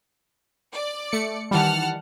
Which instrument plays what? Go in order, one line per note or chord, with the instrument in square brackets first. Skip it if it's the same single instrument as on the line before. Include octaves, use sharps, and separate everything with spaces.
[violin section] D5
[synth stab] A3 C#7
[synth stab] D#3 E3 G3 [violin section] F#5 A5 F6